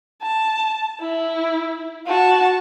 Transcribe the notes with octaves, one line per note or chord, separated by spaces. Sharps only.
A5
E4
F#4 A5